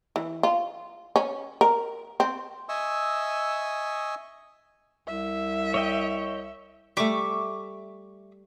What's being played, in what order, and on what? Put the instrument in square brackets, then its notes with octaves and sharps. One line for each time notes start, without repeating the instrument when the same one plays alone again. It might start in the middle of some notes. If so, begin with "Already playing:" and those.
[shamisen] E3
F4
C#4
A#4
C4
[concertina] D#5 E5 G#5 C#6 D#6 E6
[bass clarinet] C2 [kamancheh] E5
[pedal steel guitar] C#5 D#5 G5
[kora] G3 A3 [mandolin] E5 C#6 D6